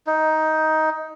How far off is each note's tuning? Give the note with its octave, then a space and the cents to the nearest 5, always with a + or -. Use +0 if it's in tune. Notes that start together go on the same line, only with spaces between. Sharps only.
D#4 +10